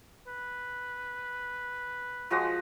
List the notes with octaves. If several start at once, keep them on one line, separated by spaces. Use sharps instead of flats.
B4
F3 G#3 F#4